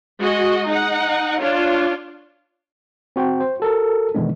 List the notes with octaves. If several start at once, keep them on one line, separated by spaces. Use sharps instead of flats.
G#3 F#4 D#5
D#4 F#5
D4 F4 C#5
C4 F#4 C5 G5
C5
F#4 A4 A#4
B2 D#3 E3 G#3 B3 D4